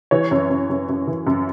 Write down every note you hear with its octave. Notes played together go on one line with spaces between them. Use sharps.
E3 C#5
F#2
F#2
F#2
F#2
E3
F#2